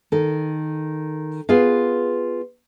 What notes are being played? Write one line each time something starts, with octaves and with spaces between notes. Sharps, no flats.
D#3 A4
B3 F4 G#4 F5